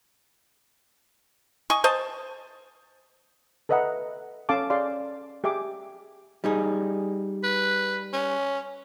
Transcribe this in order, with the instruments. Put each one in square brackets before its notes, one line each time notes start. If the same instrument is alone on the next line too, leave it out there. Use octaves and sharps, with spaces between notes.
[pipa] D#5 G#5 C#6
C5 D#5 A5
[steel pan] A4 B4 D#5 E5 F#5 A#5
C#4 A4 F5 A5 D6
G#4 D5 F5 C6
G4 G#4 E5 D6
[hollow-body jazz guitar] G3 D#4 G#4
[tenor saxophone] B4
C#4